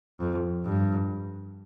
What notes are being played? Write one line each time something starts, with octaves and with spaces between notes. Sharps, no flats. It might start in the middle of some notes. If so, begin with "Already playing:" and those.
F2
G2